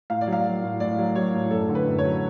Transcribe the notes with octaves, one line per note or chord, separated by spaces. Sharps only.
A2 F5
D5
F#3
F5
F#3
A2
A2 D5
F#3
F#3 C#5
A2
F#2 A4
D3
B4
F#2
C#5
F#3